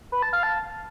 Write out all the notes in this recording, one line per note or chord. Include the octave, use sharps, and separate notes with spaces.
B4
A5
F5
A5